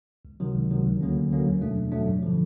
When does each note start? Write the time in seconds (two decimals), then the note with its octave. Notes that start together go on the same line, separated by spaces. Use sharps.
0.25 C#2
0.40 C3 D#3 F#3
0.55 C#2
0.71 C3 D#3 F#3
0.85 D2
1.01 D3 F#3 A#3 C#4
1.17 D2
1.32 D3 F#3 A#3 C#4
1.47 E2
1.61 B2 F#3 A3 D4
1.77 E2
1.92 B2 F#3 A3 D4
2.08 G2
2.23 D3 F3